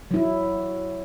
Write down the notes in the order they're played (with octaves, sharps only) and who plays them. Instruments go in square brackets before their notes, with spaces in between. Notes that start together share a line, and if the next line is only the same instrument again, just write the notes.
[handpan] F#3 E4